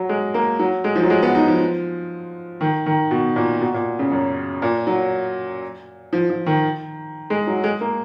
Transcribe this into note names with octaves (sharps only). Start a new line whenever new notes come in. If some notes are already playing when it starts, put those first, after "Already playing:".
Already playing: F#3
G#3
A#3
F#3
G#3
F3
F#3
G#3
B3
D#4
F3
D#3
D#3
B2
A#2
B2
A#2
C#3
F#2
A#2
F#3
F3
F3
D#3
G#3
F#3
G#3
A#3